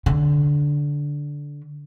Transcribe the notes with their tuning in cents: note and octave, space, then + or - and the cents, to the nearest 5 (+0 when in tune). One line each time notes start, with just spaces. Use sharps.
D3 -10